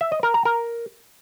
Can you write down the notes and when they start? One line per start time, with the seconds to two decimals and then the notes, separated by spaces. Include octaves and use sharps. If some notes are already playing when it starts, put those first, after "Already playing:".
0.01 E5
0.12 D#5
0.23 A#4
0.34 A#5
0.45 A#4